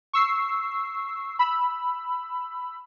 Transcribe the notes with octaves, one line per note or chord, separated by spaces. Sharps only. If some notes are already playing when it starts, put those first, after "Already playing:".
C#6 E6 C7
B5 E6